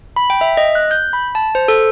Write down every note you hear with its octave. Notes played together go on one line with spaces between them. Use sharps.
B5
G5
E5
D#5
F#6
G6
B5
A5
C5
A4